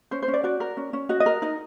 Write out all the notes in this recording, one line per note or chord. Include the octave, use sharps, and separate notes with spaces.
C#4 C5
C5
C#4
D5
F#4 D5
A#4
C#4
C#4
F#4 D#5
D#5
A#4
D#4 D#5